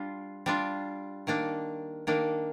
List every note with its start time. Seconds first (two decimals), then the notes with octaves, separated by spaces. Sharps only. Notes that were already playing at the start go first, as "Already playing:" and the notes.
Already playing: G3 D4 F4
0.46 G3 D4 F4
1.27 D#3 A#3 D4
2.07 D#3 A#3 D4